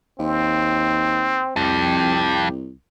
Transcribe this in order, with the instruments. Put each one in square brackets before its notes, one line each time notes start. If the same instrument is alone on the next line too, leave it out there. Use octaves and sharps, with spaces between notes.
[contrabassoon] D#2 [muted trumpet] C4
[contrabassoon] C2 [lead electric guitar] F2 [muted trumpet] G4